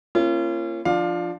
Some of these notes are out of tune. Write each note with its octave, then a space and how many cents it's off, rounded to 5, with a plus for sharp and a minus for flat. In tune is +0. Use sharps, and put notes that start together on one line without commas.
A#3 +0 C#4 -25 F4 -40
F3 +0 D4 +15 F5 +15